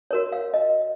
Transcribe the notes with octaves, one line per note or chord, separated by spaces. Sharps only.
F#4 A#4 C#5
F5
D#5